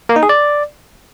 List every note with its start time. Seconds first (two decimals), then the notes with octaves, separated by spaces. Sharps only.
0.09 A#3
0.16 D#4
0.23 G#4
0.29 D5